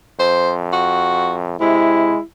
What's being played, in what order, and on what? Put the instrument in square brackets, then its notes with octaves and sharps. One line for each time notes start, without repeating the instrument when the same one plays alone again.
[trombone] F2 [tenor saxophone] C5
[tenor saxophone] F#4
[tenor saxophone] C3 [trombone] G#3 [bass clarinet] E4